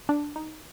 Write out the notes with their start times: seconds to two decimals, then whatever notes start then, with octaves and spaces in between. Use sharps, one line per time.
0.09 D4
0.36 D#4